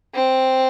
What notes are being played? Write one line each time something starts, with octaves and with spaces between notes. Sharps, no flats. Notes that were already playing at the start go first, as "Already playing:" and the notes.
C4